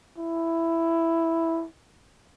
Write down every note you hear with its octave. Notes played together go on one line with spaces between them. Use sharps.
E4